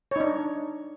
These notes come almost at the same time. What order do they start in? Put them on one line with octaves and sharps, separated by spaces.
C#5 D#4 D4